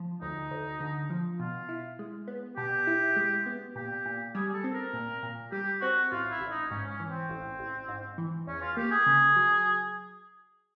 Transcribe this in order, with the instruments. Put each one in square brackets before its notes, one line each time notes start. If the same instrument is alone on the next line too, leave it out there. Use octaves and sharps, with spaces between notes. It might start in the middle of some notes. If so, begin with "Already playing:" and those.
Already playing: [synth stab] F3
[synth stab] D2 [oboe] D#4
[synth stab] D2
D3
F3
[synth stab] B2 [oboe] F4
[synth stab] E4
G#3
B3
[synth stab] B2 [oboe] G4
[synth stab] E4
G#3
B3
[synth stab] A#2 [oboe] G4
[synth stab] A#2
[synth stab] G3 [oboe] G#4
[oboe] G#4
A4
[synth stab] C4
[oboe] A#4
[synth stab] A#2
A#2
[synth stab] G3 [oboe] G4
[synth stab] C4 [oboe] F#4
[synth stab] A1 [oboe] F4
[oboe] E4
[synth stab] A1
[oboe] D#4
[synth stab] G#2 [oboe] C#4
[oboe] C#4
[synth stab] E3
[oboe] C4
[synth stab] A1
A1
G#2
E3
[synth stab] E2 [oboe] C#4
[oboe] F4
[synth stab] A#3 [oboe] G4
[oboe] G#4
[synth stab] C#3
F#3